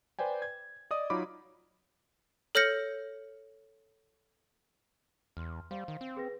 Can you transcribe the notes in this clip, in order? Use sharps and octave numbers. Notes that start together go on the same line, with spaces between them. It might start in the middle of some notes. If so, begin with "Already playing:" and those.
B4 C5 D5 G5 G#5
G#6
D5 D#5 D#6
F#3 D#4 F4 C#5 B5 D6
A4 C#5 F6 G6 A#6 C#7
E2 C6 F6
G3 C5 F5 C6
D#3
C4
G#4 B4 A#6